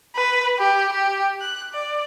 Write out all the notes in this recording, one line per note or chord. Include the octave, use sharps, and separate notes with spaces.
B4
G4
G4
F#6
D5